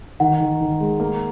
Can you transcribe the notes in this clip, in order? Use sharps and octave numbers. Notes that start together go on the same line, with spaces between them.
D#3 F#5
D#3
D#3
G#3
A#3